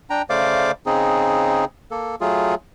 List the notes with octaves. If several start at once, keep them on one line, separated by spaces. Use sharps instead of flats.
D4 G5 A#5
C#3 A3 C5 D5 F5 D6
C#3 C4 D#4 G#4
A#3 A4
F#3 A3 F4 G#4